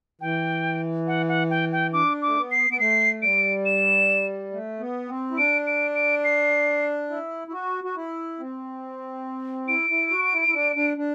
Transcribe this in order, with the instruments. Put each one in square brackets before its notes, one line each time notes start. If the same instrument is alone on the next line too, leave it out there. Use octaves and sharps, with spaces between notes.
[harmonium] E3 [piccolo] G5
[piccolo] F#5
F#5
G5
G5
[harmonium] D4 [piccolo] D6
[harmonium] A3 [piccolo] D6
[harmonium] B3
[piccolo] C7
[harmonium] B3 [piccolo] D7
[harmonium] A3 [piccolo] C7
[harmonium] G3 [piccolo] D7
[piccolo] E7
[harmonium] A3
B3
C4
E4
[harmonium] D4 [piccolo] D7
[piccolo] D7
D7
C7
[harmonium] E4
E4
F#4
F#4
E4
C4
[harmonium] E4 [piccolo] D7
[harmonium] E4
F#4
E4
E4
D4
D4
D4